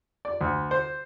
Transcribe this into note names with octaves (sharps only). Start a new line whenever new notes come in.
D5
D2
C5